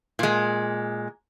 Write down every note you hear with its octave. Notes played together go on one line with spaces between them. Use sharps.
A#2 G#3